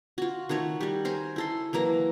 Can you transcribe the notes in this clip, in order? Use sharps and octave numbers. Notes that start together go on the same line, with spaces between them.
F4 F#4
D#3 A3 F#4 C#5
G3 F#4
A#4 C5 G#5
E4 A4 C6
E3 F#3 A#3 A#5